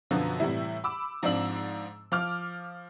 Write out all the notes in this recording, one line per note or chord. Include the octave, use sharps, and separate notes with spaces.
F#2 B2 D3 F3 B3
A2 C3 E3 G3 E4
B5 D6 E6
G#2 F3 C4 D4 E6 F#7
F3 D6 F6